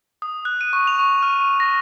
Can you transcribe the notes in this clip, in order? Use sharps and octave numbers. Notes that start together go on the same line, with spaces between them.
D#6
F#6
D#7
C#6
F7
C#6
F6
C#6
A#6